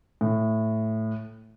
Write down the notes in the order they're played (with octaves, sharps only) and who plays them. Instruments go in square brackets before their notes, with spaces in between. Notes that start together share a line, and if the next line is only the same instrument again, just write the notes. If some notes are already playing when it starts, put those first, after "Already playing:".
[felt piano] A2